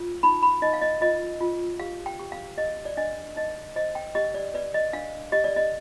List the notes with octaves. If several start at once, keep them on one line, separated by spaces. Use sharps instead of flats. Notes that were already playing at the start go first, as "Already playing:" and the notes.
Already playing: F4
D#4 B5
B5
D#4 D#5
F5
D#5
F4 D#5
F4
G4 F5
G5
G4
F5
G4 D#5
D5
D4 D#5
D#4 D#5
C5 D#5
G5
G4 D#5
D5
B4 D5
D#5
D4 F5
G4 D#5
D5
D#5